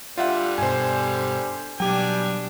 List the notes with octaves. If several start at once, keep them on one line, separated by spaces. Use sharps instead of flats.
D3 G3 F4 E5 F#5
G2 B2 C5 G#5
B2 F#3 G3 D4 G4 G5 G#5